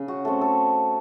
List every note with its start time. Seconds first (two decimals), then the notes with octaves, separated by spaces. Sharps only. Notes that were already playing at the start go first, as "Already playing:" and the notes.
Already playing: C#3
0.08 F#4
0.25 A3 C4 A4
0.41 A4